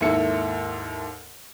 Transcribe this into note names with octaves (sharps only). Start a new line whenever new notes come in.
D#2 G#2 A#3 E4 A4 C#7